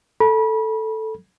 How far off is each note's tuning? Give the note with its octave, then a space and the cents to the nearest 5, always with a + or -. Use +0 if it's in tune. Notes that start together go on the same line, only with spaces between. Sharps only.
A4 +0 B5 -35